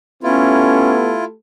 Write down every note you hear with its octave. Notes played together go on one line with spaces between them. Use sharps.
A3 B3 C#4 E4 F4 G4 A4